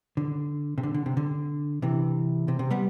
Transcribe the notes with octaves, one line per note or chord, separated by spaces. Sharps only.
D3
C3
D3
D3
C3
D3
C3 E3
C3
C3
G3 B3